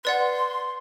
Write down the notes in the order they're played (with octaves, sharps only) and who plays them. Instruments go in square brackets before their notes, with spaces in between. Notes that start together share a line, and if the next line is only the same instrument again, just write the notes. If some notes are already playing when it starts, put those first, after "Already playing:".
[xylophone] B4 D5 F#5 [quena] C6